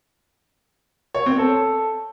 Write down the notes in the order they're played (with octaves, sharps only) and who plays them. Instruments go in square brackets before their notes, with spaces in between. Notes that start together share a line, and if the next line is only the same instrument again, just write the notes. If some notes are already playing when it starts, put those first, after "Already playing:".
[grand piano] C#5
C4
A4